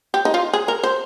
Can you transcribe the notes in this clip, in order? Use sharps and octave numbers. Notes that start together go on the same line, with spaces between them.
G4
D#4
F4
G#4
A#4
C5